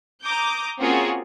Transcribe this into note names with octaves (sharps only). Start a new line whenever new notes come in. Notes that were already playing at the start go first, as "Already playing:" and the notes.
A#5 D6 D#6 G6
A#3 C4 C#4 F4 F#4 G#4